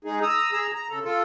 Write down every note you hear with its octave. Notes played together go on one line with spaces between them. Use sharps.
G#3 D#4 G#4
A#5 D#6 E6
G#4 A#5 E6
A#5
C#3 A4
F4 A4